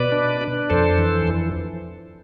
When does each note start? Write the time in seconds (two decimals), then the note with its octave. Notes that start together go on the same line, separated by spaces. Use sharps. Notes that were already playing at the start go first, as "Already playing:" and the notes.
Already playing: B2 B4 D5
0.12 D4
0.41 D4
0.70 F2 A4 C5
0.98 E3
1.27 F2